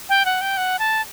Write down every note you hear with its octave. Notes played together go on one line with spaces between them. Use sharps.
G5
F#5
G5
F#5
A5